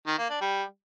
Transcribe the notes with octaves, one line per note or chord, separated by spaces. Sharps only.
D#3
A#3
D4
G3